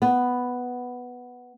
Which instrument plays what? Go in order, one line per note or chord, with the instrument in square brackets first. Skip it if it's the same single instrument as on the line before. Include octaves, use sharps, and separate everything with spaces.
[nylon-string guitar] B3